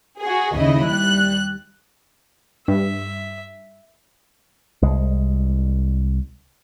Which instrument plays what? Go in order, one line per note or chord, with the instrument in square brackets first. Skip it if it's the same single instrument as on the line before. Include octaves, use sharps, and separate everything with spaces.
[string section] F#4 G#4
D#2 C#3 E4 D#5
G3 F#6
[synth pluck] G2 [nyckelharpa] E5
[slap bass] C2 G#3